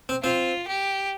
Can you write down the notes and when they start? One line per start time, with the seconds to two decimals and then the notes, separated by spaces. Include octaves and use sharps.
0.09 C4
0.23 C4 F4
0.68 G4